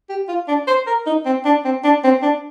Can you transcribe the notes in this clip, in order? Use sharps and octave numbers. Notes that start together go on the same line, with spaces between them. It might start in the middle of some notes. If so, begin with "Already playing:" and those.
G4
F4
D4
C5
A#4
D#4
C4
D4
C4
D4
C4
D4